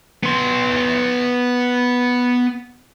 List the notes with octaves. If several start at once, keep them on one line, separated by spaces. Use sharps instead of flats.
B3 C6